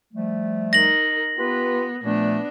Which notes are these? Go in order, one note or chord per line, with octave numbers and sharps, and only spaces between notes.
F3 G3 A3
D#4 A#4 A#6 F#7
B3 F4 G4 B4
A#2 F3 A3 B3 D4